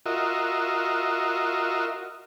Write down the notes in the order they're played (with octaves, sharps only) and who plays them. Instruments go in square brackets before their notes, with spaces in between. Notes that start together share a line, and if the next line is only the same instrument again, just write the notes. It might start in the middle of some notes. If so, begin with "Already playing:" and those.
[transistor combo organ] F4 F#4 A#4 D#5 E5